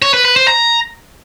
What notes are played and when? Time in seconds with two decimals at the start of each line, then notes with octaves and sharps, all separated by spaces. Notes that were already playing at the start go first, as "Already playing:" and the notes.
0.02 C#5
0.14 B4
0.25 B4
0.36 C5
0.48 A#5